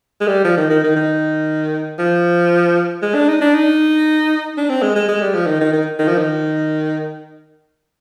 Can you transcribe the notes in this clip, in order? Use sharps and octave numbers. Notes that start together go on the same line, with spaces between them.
G#3
G3
F3
D#3
D#3
D#3
D#3
F3
G#3
D4
D#4
D4
D#4
D4
C4
G#3
G#3
G#3
G3
F3
D#3
D#3
D#3
D#3
F3
D#3